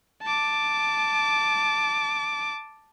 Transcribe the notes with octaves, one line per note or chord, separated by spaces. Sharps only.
A5 D6